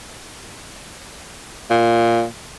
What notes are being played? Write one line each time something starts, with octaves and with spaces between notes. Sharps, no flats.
A#2